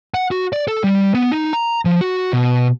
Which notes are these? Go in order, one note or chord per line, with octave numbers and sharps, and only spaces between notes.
F#5
F#4
D5
A4
G3
B3
D#4
A#5
F3
F#4
B2